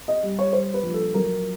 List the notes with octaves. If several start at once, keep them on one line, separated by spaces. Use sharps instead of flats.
D#5
G3
C#5
G3 C5
B4
A#1
A4
F#3 A#4